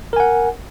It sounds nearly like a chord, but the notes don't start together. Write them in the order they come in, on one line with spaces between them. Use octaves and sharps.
A#4 G#5 F#5